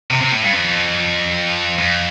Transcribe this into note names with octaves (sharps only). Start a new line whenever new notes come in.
C3
C3
A2
G2
F2
F2